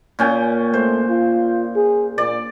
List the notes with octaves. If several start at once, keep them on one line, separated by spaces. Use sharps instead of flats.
A#2 C#4 G5
A3 C5
F4
G#4
A#2 D5